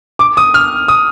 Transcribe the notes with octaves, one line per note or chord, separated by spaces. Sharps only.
D6
D#6
F6
D#6